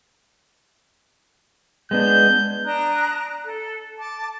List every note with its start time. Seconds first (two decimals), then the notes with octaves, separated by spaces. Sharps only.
1.91 G#3 B3 D4 G6
2.65 D4 A#5 D#6 F#6
3.45 A4
3.99 A5 D6